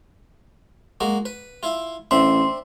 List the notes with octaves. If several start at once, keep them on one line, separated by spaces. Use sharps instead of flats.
G#3 A#3 F#4
B4
E4 F4
A1 C4 D4 E5 C6